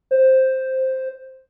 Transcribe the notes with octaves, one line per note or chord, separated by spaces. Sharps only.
C5